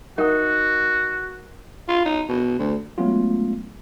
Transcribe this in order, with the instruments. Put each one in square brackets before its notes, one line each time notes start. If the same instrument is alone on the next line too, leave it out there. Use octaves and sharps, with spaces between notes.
[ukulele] D#4 [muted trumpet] F#4 [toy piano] A#4 F#5
[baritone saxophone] F4
D#4
B2
D2
[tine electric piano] F#3 G#3 A3 B3 C#4 F4